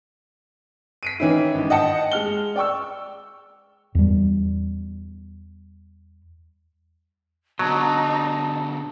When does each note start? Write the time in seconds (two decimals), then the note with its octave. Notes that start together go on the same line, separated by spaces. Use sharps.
1.03 B6 D7 D#7
1.20 D#3 E3 C#4 D#4 E4
1.54 G#1 G2
1.70 D#5 F#5 G5 A5 C#7
2.12 G#3 F6 G7
2.56 D5 G5 C#6 E6
3.95 E2 G3
7.59 B2 D3 F#3 D#4 A5